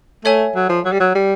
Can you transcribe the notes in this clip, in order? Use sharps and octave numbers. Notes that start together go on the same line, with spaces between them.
A3 A4 C#5 E5 G#5
F#3
F3
F#3
G3
F#3
G3